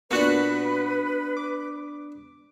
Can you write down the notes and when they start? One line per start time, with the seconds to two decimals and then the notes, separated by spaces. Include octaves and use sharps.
0.11 A#2 B3 D4 F#4 B4 F#6
1.37 D6